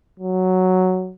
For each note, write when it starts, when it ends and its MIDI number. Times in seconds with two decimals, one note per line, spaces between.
0.19 1.13 54